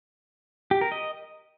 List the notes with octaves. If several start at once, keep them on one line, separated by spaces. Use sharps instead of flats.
G4
A#4
D#5